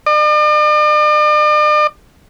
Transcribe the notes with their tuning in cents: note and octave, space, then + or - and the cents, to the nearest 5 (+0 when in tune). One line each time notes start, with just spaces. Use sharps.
D5 +45